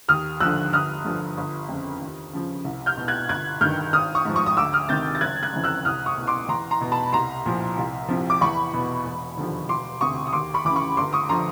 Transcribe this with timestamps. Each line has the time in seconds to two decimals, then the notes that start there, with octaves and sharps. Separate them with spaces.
0.08 D#2 D#6 F6
0.40 D3 F3 E6 F#6
0.73 G1 D#6 F6
1.05 G2 D3 F3
1.37 G1
1.69 F2 C#3
2.01 D#2
2.33 C#3 F3
2.64 C2
2.86 F6 G6
2.97 B2
3.08 F#6 G#6
3.29 G1 F#6 G#6
3.61 G2 D#3 F6 G6
3.93 G#1 D#6 F6
4.15 C#6 D#6
4.25 G#2 F3
4.36 C#6 D#6
4.46 D#6
4.57 D2 D6 E6
4.73 D#6 F6
4.89 C3 D#3 G6 A6
5.15 A6
5.21 F#1 F#6 G#6
5.43 F#6 G#6
5.54 F2 C#3 E3
5.64 E6 F#6
5.85 C2 D#6 F6
6.06 C#6 D#6
6.17 B2
6.27 C6 D6
6.49 E2 A#5 C6
6.71 A#5 C6
6.81 B2
6.92 A5 B5
7.13 C2 A#5 C6
7.46 A#2 F3
7.77 C2
8.09 C3 F3
8.30 D6
8.41 E2 B5 C#6
8.73 B2
9.05 E1
9.37 D#2 D3 F3
9.69 E1 C6 D6
10.01 D2 C3 C#6 D#6
10.27 D#6
10.33 D#2 C6 D6
10.54 B5 C#6
10.65 C#3 E3 D6
10.76 B5 C#6
10.97 G1 C6 D6
11.13 C#6 D#6
11.29 D3 F3 A#5 C6